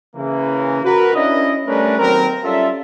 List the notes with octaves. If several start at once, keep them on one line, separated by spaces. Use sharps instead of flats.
C#3 E3 A#3
F#4 A#4 B4
C#4 D4 E4 D#5
G3 A3 C#4 D4 A#4 B4
D#2 F#3 C4 A#4
G3 C#4 F4 A4 E5